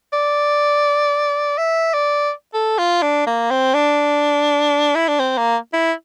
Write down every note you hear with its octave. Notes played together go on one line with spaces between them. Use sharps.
D5
E5
D5
A4
F4
D4
A#3
C4
D4
E4
D4
C4
A#3
E4